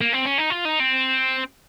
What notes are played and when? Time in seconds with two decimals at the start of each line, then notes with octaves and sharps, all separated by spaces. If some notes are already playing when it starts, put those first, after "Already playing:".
0.01 A#3
0.13 C4
0.25 C#4
0.38 D#4
0.50 F4
0.65 D#4
0.79 C4